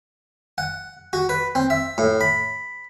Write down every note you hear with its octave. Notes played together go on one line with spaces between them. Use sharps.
F#5
F#4
B4
C4
E5
A2
B5